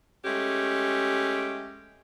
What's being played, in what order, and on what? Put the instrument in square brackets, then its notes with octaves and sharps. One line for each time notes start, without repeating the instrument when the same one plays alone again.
[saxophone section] G#3 A3 C#4 G4